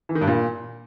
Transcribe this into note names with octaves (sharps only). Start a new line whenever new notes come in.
E3
D#3
G2
A#2